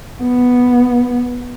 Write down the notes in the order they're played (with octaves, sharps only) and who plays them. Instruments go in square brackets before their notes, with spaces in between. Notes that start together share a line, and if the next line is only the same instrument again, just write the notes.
[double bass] B3